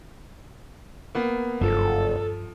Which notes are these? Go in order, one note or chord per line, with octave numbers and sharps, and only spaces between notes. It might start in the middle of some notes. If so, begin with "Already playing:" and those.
A#3 B3
F#1 G2 F3 A4